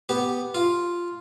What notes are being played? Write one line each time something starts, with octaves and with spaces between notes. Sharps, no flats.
B3 G4
F4